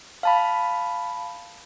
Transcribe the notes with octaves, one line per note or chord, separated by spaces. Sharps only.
F5 A5 B5